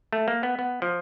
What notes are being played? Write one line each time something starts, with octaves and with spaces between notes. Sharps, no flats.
A3
A#3
B3
B3
F3